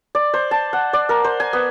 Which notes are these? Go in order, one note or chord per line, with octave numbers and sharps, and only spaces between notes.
D5
C5
A5
F#5
D5
A#4
C5
G#5
B3